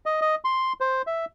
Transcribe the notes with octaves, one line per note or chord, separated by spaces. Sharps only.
D#5
D#5
C6
C5
E5